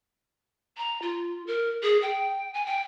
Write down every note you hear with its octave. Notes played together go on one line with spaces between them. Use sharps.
A#5
F4
A#4
G#4
G5
G#5
G5